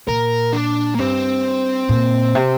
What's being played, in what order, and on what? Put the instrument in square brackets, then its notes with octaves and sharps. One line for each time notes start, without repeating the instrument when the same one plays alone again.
[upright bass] A#2 [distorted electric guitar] A#4
[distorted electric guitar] D4
A#3
[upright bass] G2 [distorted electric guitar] C4
[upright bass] A#2
C3